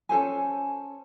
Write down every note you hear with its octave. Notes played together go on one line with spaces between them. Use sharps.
C#4 A4 C5 G#5